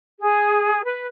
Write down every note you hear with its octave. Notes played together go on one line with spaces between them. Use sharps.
G#4
B4